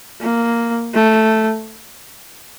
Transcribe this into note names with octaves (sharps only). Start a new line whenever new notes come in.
A#3
A3